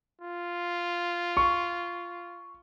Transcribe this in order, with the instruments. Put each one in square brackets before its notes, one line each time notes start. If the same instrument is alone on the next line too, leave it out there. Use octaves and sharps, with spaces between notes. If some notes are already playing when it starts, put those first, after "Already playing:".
[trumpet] F4
[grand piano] C#6